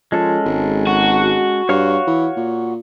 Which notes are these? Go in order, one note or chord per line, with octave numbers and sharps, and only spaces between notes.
F3 G#3 C#4 A4
G#1
F#4
G2 C#5 F5 C#6
E3
A#2